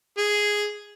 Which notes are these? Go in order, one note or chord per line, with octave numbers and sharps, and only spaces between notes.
G#4